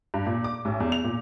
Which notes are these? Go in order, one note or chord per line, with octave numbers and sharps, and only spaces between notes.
G2
A#2
D6
A1
E2
F7
A#2